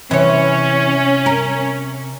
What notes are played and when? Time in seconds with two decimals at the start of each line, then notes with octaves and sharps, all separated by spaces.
0.11 C3 E3 C#4 C#5
1.26 A#4